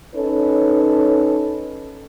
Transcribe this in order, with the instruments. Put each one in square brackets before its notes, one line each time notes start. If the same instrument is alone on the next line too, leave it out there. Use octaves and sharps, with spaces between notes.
[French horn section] C#4 D#4 A4 B4 C#5